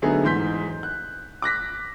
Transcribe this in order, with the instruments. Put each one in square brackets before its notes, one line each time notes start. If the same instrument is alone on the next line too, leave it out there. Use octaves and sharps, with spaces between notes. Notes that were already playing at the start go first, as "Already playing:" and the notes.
[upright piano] D3 F#3 A3 B3 D#4 G#4
E2 G#2 C6 G6 B6
F#6
D6 F#6 A#6 B6